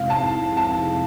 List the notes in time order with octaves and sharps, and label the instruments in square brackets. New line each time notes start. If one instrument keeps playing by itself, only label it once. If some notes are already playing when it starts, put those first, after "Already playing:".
Already playing: [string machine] F2 C3 G#3 C4 E4 [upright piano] F5
[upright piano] A5
A5